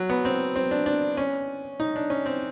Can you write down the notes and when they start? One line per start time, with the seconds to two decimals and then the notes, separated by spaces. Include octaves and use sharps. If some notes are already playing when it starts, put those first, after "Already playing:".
Already playing: F#3
0.10 B3
0.25 C4
0.56 C4
0.71 D4
0.86 D4
1.17 C#4
1.80 D#4
1.96 D4
2.10 C#4
2.26 C4